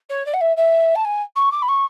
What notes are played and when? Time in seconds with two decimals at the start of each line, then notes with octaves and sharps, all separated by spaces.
0.09 C#5
0.25 D5
0.33 F#5
0.40 E5
0.56 E5
0.95 A5
1.04 G#5
1.35 C#6
1.51 D6
1.62 B5
1.68 C#6